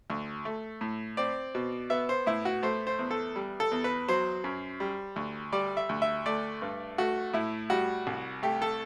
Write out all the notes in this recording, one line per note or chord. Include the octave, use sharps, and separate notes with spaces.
D2
A3
A2
C4 D5
B2
B3 E5
C5
A2 E4
F#4
A3 C5
C5
E2
A4
G3
A4
E2
B4
F#3 C5
F#2
G3
D2
G3 D5
E5
D2
E5
A3 D5
G2
A3 F#4
A2 E4
G3 F#4
C2
A3 G4
A4